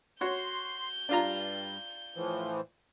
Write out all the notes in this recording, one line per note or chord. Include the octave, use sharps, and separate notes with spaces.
F#4 C#5 C6 G6
G2 G3 D4 F4 A#5
A2 E3 F3